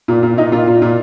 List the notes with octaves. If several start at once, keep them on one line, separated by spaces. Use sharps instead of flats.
A#2
A#2
A#2 D#4
A#2 F4
A#2
A#2